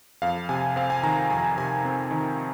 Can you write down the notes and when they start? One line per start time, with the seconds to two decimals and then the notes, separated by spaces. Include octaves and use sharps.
0.22 F2 F5
0.49 C3 G#5
0.76 C4 F5
0.90 G#5
1.03 D#3 A#5
1.30 F2 G#5
1.57 C3 G#5
1.85 C4
2.11 D#3